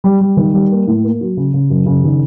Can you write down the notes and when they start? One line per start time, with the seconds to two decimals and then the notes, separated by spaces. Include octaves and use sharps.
0.04 G3
0.21 G3
0.37 D#3
0.53 G3
0.71 A#3
0.87 A2
1.04 A#3
1.21 F#3
1.37 C#3
1.54 C#3
1.70 F#2
1.86 C#3
2.04 D#3